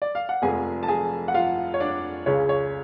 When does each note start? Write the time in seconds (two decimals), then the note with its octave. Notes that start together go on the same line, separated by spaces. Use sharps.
0.02 D5
0.15 F5
0.29 F#5
0.42 F1 F2 F3 G#3 G#4 G#5
0.83 A5
0.88 G#4 G#5
1.28 F#5
1.34 F4 F5
1.74 C#5
1.80 D4 D5
2.26 C#2 C#3 G#3 C#5
2.49 C#5